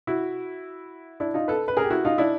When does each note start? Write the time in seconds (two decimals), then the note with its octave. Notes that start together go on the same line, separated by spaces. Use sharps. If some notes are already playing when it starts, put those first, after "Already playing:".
0.07 E4 F#4
1.20 D4 E4
1.34 D#4 F4
1.48 A4 B4
1.68 B4
1.77 G#4 A#4
1.84 G4
1.90 E4 F#4
2.05 D#4 F4
2.18 D4 E4